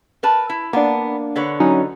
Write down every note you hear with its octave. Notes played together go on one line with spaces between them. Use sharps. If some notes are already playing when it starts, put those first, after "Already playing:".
A#4 B4 A5
E4
A#3 B3 D4
D3 B4 C#5
F#3 C#4 D#4